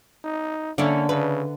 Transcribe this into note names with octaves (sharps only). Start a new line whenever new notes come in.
D#4
D3 A#3 C#4 D4 E4
C#3 B4